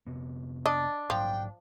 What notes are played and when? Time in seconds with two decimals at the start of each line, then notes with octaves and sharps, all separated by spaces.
0.07 F1 C3 B3
0.66 D4 D#5
1.10 A#1 G#2 F3 F#3 G5